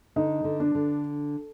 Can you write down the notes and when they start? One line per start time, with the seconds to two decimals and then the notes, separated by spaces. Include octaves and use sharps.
0.16 D3 D#4
0.44 D3
0.60 D4
0.75 D3